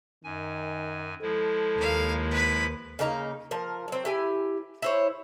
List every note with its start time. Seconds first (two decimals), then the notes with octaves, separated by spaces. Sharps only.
0.24 F#2 D#3 G#5
1.22 F3 G#3 E4 A4
1.78 D#2 A#3 F5
2.31 B4 B5
2.99 C#3 A#3 D#4 A#5
3.51 F3 A#4
3.88 F#3 C4
4.05 E4 G4 G#5
4.82 E4 C5 C#5